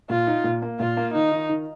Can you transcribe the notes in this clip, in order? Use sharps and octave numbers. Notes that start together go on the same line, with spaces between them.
A#2 F4
D#4
A#2
A#3
A#2 F4
A#3
D#3 D#4
D#3
D#3